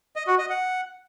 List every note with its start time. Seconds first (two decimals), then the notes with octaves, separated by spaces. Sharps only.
0.16 D#5
0.27 F#4
0.39 D#5
0.50 F#5